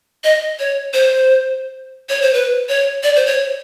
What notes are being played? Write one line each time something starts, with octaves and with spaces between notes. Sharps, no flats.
D#5
C#5
C5
C#5
C5
B4
C#5
D5
C5
C#5